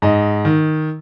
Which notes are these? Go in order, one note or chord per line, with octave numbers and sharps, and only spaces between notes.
G#2 D#5
D#3